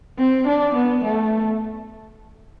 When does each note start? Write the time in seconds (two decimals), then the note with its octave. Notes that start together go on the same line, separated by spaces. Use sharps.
0.18 C4
0.48 D4
0.75 B3
1.04 A3